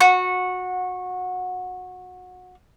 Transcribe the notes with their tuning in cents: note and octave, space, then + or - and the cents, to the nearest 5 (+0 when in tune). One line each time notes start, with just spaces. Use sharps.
F#4 -20